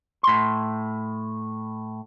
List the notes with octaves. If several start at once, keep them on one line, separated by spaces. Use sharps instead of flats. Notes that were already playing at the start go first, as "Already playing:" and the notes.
A2 C6